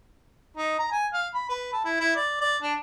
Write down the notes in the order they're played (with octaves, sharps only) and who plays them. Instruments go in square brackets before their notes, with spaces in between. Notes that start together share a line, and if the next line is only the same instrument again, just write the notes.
[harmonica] D#4
A#5
G#5
F5
B5
B4
A4
E4
E4
D5
D5
D4